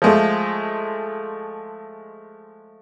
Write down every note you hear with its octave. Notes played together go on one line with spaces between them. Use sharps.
F3 G#3 A3